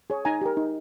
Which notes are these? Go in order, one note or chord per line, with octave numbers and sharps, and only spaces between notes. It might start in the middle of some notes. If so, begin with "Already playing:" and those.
G#4 C#5
D#4 G#5 A#5
G4 A#4
D#4